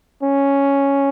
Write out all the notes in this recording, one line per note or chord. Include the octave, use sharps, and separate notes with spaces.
C#4